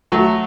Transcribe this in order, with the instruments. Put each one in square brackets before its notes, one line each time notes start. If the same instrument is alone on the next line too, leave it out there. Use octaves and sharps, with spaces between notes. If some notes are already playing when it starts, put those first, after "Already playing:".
[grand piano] F#3 A3